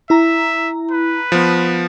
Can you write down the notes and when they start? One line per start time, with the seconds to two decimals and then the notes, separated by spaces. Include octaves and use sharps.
0.10 E4 E5 A#5
0.91 B4
1.32 F3 B3